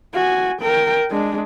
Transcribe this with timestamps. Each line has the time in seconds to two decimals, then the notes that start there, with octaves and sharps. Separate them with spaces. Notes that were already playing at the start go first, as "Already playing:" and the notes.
0.14 F#4 G#5
0.61 A#4 G5
1.11 G#3 D4